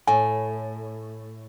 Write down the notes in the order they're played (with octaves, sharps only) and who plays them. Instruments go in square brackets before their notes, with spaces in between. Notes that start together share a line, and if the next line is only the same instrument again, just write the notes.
[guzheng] A2 [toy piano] G#5